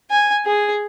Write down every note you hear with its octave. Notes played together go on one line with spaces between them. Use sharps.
G#5
G#4